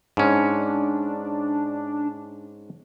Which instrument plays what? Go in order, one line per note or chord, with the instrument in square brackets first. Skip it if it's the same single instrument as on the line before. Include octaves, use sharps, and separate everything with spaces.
[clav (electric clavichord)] G#2 C#4 [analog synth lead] D4